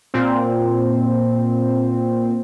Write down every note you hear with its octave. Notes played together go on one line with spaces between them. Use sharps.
A#2 C4